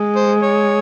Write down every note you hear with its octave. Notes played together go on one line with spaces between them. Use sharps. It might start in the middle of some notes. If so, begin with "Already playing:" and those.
Already playing: G#3
C5
C#5